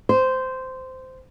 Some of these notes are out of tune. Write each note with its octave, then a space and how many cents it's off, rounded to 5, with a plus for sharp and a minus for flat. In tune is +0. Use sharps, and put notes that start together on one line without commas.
C5 -15